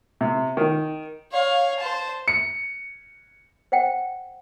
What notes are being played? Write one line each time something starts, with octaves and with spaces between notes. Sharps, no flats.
C3
D#3
C#5 F5
C5 A5
C#7
C5 D#5 F#5 G5